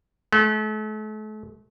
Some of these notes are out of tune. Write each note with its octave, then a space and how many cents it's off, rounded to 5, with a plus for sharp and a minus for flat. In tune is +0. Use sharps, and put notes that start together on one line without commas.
A3 -40